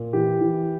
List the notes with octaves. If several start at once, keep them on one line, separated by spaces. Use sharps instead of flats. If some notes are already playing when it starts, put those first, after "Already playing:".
Already playing: A#2
E3 G4
E3